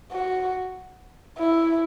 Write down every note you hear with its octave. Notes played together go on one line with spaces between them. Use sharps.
F#4
E4